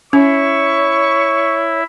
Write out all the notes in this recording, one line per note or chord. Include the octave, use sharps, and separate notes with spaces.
C#4 E4 C#5 E5 C#6